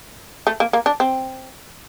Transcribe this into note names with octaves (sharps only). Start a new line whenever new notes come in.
A3
A#3
A#3
D4
C4